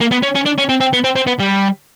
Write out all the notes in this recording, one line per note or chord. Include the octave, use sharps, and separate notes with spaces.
A#3
B3
C#4
C#4
D4
C#4
C4
C4
B3
C4
C4
B3
G3